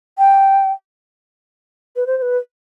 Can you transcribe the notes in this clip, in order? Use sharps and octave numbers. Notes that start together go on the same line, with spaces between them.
G5
B4
C5
C5
B4